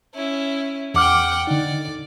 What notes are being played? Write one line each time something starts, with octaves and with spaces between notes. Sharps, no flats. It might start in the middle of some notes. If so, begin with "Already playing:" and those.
C#4 E4
E2 F#5 G5 D6 F6
D3 D#4 D5